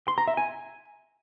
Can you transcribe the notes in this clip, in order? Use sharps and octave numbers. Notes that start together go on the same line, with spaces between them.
C6
A#5
E5
G#5